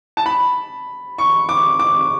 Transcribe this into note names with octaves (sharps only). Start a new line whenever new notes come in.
A5
B5
C#6
D6
D6